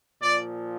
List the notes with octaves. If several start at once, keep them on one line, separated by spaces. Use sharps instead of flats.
A#2 F3 D5